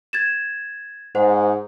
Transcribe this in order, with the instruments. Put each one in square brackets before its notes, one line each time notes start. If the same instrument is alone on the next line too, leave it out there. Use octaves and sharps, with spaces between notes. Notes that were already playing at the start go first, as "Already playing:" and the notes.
[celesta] G#6 A6 E7
[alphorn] G#2 [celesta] C5 F#5